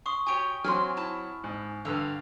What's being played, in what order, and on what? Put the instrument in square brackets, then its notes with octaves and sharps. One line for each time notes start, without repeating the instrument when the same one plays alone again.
[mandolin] C6 [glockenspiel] C#6 D#6
[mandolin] F#4 G4 C#5 [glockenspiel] G#5 C#6 D7
[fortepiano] F#3 C4 [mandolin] G#5 B5 C6 [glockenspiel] F6
[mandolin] E4 A5
[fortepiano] G#2
[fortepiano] G2 D3 [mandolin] F5 E6